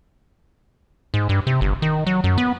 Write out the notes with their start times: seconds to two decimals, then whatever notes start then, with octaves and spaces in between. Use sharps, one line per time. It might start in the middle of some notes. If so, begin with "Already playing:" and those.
1.14 G#2
1.29 G2
1.47 C3
1.61 G1
1.82 D#3
2.07 F#3
2.24 F#2
2.38 B3